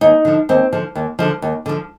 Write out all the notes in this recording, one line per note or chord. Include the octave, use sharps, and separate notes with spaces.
D#2 D#4
D3 F3
D#2 C4
D3 F3
D#2
D3 F3
D#2
D3 F3